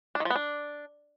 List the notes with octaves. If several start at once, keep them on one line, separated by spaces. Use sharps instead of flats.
D4
D#3
F3
B3
D4